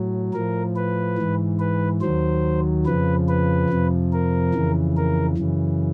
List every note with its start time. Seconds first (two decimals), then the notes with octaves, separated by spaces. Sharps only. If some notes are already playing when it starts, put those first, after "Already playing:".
Already playing: A2 F#3
0.33 A2 F3 A#4
0.76 B4
1.18 G#2 E3
1.60 B4
2.01 D#2 D#3 F#3 C5
2.86 F2 C#3 F3 B4
3.29 B4
3.70 F2 C3 F3
4.12 A#4
4.54 F2 C#3 E3
4.97 A#4
5.38 F#2 C#3 E3